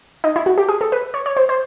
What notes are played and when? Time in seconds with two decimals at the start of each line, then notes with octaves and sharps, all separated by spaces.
0.24 D#4
0.36 E4
0.46 F#4
0.58 G4
0.69 G#4
0.81 A4
0.92 B4
1.14 C#5
1.26 C#5
1.37 C5
1.49 C5